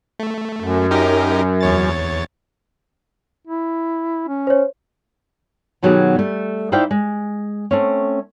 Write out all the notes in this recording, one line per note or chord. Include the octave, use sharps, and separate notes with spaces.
A3
F#2
D#4 G4 A#4
E2 C#5 A6
E4
C#4
C5 C#5
B2 D#3 F#3 B3 G4 G#4
G3 A3
D#4 E4 C5 D5 F5 G5
G#3
A3 C4 C#4